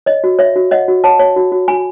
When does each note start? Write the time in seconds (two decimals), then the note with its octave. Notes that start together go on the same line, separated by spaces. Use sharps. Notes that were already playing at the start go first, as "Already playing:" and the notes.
0.06 C#5 D#5
0.24 F#4
0.39 C#5 E5
0.56 F#4
0.71 C#5 D#5 F#5
0.88 F#4
1.04 C#5 F#5 A5
1.19 C#5
1.36 F#4
1.52 F#4
1.68 F#4 G#5 B5